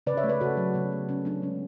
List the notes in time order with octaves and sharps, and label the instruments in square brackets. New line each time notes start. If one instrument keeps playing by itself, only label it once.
[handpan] C#3 B4 D5
C#5 E5
A3
B4 D5
C#3 F#4 A4
F#3
C#3 B3
A3
C#3 C#4
F#3 B3 D4
G#3 C#4